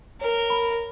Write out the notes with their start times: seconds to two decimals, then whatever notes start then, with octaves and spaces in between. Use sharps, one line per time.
0.21 A#4 C#5
0.50 B5